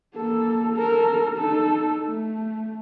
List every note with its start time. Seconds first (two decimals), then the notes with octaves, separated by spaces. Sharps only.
0.16 A#3 A4
0.74 A4 A#4
1.37 D#4 A4
2.06 A3